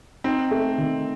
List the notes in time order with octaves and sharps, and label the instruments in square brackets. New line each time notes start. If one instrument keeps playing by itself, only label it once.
[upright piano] C4 [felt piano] D#4
[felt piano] A3
D#3